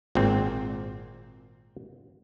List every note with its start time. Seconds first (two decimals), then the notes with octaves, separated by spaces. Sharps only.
0.15 G#1 A#2 C4